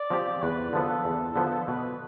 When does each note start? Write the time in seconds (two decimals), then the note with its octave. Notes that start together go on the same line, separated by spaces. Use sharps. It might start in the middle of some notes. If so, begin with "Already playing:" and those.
Already playing: D5
0.10 F3 C4 G4
0.42 E2 B4
0.73 D3 F3 B3 A4
1.05 E2
1.36 D3 F3 B3
1.67 B2 B4